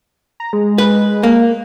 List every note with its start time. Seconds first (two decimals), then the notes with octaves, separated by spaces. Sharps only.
0.40 A#5
0.53 G#3
0.78 B4
1.23 A#3